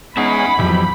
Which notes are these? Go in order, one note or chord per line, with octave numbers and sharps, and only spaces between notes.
G#3 B3 C#4 D#4 E5 F#5 B5
B1 F2 E3 F#3 G4